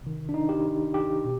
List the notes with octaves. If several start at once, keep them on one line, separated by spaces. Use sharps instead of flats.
C3 D#3
D4
D#4
G4
G4
B2